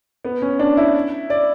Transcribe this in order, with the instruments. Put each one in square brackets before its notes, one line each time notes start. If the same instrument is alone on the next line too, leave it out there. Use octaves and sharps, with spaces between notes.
[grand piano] B3
C#4
D4
E4
D5